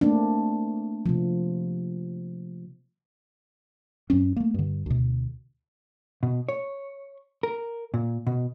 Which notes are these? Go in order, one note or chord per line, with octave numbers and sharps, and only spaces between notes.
A3 A#3 C4 D4
C3 F3
F#2 F#3 C4 C#4
A3 A#3
G2 D3
D2 B2
B2
C#5
A#4
A#2
B2